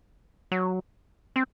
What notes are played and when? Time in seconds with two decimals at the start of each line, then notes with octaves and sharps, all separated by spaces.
0.52 F#3
1.36 C4